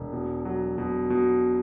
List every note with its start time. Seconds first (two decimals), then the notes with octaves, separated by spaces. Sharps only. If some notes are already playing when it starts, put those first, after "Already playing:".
Already playing: E1
0.13 B2
0.45 F#3
0.78 B2
1.10 B2